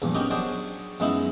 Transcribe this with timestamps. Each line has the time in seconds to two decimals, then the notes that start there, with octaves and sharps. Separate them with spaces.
0.02 A#1 E2 G2
0.15 B3 C#4 D#4 F#4 G4 A#4
0.30 F#3 D4 G#4 C5 C#5 D#5
1.00 F#2 G#3 B3 D#4 E4